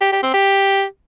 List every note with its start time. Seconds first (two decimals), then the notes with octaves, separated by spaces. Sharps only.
0.01 G4
0.12 G4
0.23 C4
0.34 G4